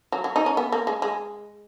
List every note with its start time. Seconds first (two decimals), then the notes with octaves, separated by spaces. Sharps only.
0.12 F#3
0.24 F#3
0.36 D#4
0.46 C#4
0.57 B3
0.72 A#3
0.87 G#3
1.02 G#3